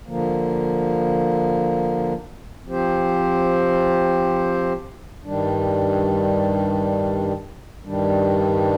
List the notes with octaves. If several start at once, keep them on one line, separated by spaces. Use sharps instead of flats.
D3 F3 A#3
F3 C4 G4 C5
G2 D#3 G3 D4
G2 D#3 G3 D4